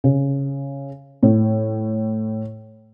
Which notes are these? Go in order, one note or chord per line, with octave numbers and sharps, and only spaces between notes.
C#3
A2